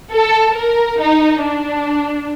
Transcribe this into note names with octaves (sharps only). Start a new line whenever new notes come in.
A4
A#4
D#4
D4